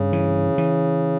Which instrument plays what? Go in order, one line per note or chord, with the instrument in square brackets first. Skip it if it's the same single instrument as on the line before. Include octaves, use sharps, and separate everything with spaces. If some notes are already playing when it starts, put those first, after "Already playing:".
Already playing: [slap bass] G2 [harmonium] C#3
[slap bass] E3
E3